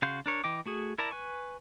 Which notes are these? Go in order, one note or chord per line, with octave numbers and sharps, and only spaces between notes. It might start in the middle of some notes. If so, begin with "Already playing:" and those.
C#3 F#4 F5 C6 G6
D4 A#4 C#5
E3 D#5 G5 D6
A3 F#4 G#4
E4 A#4 D5 A5 A#5
B4 G#5 C#6